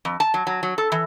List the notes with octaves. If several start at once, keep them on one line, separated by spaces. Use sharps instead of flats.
F2
A5
F#3
F#3
F#3
A4
E3